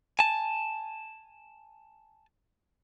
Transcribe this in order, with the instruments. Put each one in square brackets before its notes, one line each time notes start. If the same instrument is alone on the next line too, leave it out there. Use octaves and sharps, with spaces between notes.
[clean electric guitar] G#5 A5